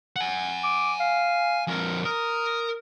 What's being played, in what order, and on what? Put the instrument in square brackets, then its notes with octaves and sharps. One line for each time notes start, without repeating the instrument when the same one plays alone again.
[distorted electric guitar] F#5 G#5
[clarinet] D6
F5
[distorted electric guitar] F2 A#4
[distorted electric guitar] A#4 [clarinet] D#6